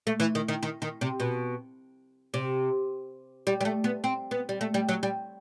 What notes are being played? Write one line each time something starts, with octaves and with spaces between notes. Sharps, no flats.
A3
E3
D#3
D#3
D#3
D#3
C3
B2
C3
G3
G3
A3
B3
C4
B3
G3
A3
G3
F#3
G3